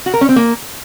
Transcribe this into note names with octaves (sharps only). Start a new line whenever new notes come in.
F#4
A#4
C#4
C4
A#3